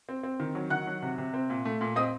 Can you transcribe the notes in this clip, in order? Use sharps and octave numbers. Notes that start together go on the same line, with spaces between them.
C4
C4
D#3
F#3
D#3 F#5 F#6
F#3
C3
C3
C4
A#2
A3
A#2
C4 D#5 D#6